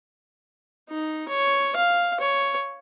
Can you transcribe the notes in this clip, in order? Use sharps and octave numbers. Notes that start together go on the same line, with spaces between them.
D#4
C#5
F5
C#5